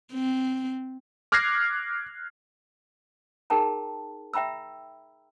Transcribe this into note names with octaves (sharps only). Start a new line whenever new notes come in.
C4
D6 F6 F#6 G#6 A#6 C7
D#4 G#4 A#4 G5 A5 A#5
E5 G5 A#5 B5 E6